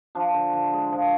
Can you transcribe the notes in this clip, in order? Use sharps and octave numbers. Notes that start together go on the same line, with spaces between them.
F3 D4 F4
D3
D3
G#3
F3